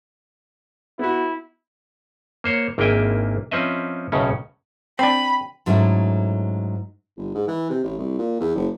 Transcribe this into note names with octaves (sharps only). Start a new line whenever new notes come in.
B3 E4 F#4
A#3 C5 C#5
G#1 A#3 D4 E4 G5 G#5
F3 C4 C#4 B4 D#5 E5
B1 A2 C#3 C#4
C4 D4 G5 B5
G#2 F#3 A3 C#4 E4
G1
G#2
E3
C3
A1
C2
A#2
E2
F#1